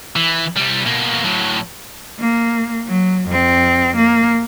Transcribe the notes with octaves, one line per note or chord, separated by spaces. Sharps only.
E3
C2 G3
B2 A#3
A2 F#3
A#3
F#3
F2 C4
A#3